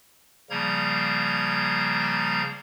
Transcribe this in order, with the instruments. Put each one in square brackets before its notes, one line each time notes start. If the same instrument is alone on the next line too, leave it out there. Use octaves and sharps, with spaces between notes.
[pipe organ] C#3 F3 G3 A#3 A#5 G#6